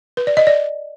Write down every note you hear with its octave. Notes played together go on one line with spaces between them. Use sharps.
B4
D5
D#5
D5